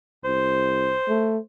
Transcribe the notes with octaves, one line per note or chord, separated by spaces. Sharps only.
C2 C5
A3